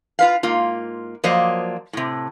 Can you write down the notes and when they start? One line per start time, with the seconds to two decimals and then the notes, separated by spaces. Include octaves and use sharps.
0.19 F4 B4 F5
0.43 G#2 A#3 F4
1.24 F3 F#3 A#3 C5 D5 D#5
1.93 A2 C3